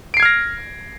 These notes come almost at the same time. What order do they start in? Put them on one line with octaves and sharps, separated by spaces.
D7 C7 G#6 F6 A#6